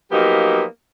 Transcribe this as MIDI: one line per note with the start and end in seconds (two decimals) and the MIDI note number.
0.12 0.63 53
0.12 0.63 54
0.12 0.63 58
0.12 0.63 59
0.12 0.63 63
0.12 0.63 67